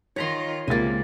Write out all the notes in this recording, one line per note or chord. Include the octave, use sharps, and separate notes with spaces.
D#3 F4 C#5 A#5 C6
C#2 C3 A#3 G#5 A6